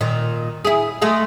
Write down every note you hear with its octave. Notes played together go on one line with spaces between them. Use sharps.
A#2 D#3
E4 G#4
G#3 A3 G#4